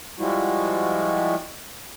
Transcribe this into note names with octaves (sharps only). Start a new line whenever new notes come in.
F3 G3 G#3 E4 F#4